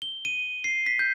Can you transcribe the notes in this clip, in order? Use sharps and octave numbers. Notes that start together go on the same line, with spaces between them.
G7
D#7
C7
B6
G6